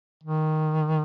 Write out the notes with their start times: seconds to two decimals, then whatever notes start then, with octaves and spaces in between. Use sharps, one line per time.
0.23 D#3